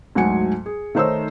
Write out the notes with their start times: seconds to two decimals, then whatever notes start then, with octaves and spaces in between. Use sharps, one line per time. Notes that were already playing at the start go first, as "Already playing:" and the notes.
0.15 D2 G#2 F#3 F#5 G#5 C#7
0.66 G#4
0.95 D#3 A3 D#4 C5 C#5 E6